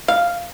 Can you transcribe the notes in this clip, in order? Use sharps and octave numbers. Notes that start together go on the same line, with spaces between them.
F5